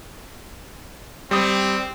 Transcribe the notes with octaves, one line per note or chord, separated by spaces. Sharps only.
G3 C4 D#6